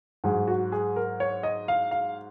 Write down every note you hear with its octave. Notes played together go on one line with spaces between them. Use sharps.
G#2 F#3 G#4
F#4
G#4
A#4
C#5
D#5
F5
F5